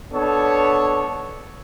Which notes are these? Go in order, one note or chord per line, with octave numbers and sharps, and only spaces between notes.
B3 D4 A4 C#5